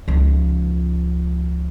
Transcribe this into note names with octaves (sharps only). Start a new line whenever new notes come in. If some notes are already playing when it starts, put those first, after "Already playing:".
C#2 F3